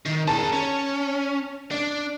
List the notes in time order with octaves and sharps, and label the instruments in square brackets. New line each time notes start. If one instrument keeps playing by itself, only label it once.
[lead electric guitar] D#3
[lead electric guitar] G#4 A#4 [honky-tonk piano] A5
[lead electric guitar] C#4
D4